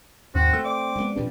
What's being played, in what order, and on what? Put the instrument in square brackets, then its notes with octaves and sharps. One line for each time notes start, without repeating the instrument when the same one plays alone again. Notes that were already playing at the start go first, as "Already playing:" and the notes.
[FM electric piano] D#2 [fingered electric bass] G#2 [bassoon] C4 [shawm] F#4
[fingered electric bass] A3 [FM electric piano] E6
[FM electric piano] D5 [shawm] D6
[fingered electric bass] G#3 A3 B3
[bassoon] G2 [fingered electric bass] A#2 F3 C4